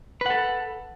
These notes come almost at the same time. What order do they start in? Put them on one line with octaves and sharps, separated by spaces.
B4 F#5 A4